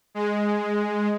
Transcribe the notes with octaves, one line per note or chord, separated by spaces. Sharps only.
G#3